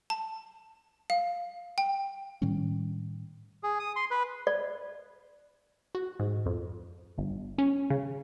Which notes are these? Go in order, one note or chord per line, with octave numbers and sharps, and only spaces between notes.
A5
F5
G5
A2 D#3 G3 C#4
G#4
D#6
C6
B4
D5
F#4
G#2
F2
G1
C#4
C#3